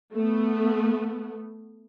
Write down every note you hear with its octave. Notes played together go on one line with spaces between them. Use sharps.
A3 B3